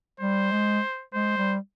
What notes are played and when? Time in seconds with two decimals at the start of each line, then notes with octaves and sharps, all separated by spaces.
0.20 G3 C5
0.52 G#3
1.14 G#3 C5
1.37 G3